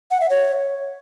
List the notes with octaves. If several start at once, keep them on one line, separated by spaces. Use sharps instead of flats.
F#5
E5
C#5